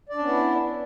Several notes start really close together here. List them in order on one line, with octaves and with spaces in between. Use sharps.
D5 D4 C#4 B3 E4